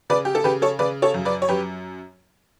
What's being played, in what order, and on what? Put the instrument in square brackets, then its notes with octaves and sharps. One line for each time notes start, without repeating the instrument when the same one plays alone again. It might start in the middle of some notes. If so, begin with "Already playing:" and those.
[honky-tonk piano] C#3 B4 D5
G4
A4
C#3 G4 B4
A4 C#5
C#3 B4 D5
A4 C#5
F#2
B4 D5
C#5
F#2 G4 B4